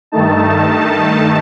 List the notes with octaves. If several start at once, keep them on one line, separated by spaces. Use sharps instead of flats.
G2 D#3 A3 D#4 A5